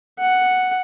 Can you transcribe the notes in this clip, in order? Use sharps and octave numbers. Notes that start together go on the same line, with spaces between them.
F#5